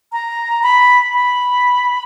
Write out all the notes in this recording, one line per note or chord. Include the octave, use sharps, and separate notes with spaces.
A#5
B5
B5